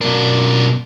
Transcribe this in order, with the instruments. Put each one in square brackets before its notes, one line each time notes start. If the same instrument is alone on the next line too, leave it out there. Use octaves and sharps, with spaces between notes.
[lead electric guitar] F#2 D4 [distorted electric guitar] B2 A#4